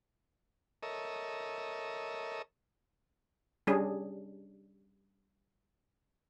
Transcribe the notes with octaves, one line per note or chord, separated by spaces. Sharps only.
A4 A#4 C#5 D#5 E5
G3 C#4 D4 G#4